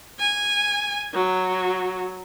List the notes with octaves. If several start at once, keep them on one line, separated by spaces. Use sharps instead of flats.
G#5
F#3